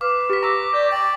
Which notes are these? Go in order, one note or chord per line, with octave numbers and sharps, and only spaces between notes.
B4 F5 D6
G4 C#6 B6
A#5 D6 E6 A#6
G4 D5
D5 G5